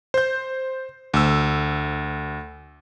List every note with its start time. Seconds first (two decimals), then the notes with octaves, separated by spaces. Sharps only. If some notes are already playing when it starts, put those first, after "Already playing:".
0.14 C5 G6
1.14 D2 E6